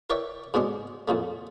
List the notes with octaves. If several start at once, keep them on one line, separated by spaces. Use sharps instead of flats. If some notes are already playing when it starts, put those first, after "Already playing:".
A#4 B4 C#5 D5 E5 G5
G#2 B2 G#3 C#4 D4
F2 A#2 C#3 A3